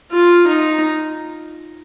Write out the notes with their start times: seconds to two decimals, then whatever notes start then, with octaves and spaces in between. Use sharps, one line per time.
0.11 F4
0.47 D#4